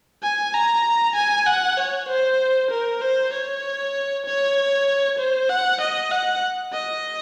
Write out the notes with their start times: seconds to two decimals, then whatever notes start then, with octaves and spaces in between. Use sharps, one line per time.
0.23 G#5
0.54 A#5
1.16 G#5
1.47 F#5
1.78 C#5
2.09 C5
2.71 A#4
3.02 C5
3.33 C#5
4.26 C#5
5.19 C5
5.50 F#5
5.81 D#5
6.12 F#5
6.74 D#5